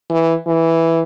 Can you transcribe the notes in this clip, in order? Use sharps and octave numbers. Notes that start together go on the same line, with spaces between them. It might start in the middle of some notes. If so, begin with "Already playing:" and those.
E3
E3